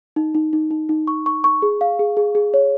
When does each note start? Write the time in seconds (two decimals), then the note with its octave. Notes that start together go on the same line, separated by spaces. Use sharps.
0.16 D#4
0.35 D#4
0.53 D#4
0.71 D#4
0.89 D#4
1.07 C#6
1.26 C#6
1.44 C#6
1.62 G#4
1.81 F5
1.99 G#4
2.17 G#4
2.35 G#4
2.54 C#5